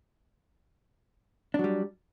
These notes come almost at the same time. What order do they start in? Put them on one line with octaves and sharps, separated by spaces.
D4 F#3 G3